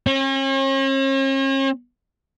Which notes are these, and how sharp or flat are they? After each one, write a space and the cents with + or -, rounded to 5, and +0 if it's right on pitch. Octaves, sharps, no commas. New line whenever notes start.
C#4 -45 C#5 -40